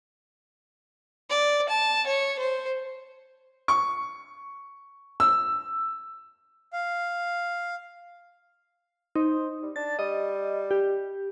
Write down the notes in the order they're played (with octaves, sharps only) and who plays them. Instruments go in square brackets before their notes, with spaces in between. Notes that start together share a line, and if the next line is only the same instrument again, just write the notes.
[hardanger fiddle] D5
A5
C#5
C5
[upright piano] C#6
E6
[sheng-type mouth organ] F5
[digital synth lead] D#4 [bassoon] C5
[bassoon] G3
[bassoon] D4 [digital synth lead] A6
[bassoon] G3 [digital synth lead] D#5
[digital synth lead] G4